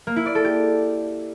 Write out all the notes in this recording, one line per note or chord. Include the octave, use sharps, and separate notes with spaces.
A#3
E4
D5
A4
G4